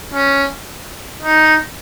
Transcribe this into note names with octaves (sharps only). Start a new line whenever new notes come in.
C#4
D#4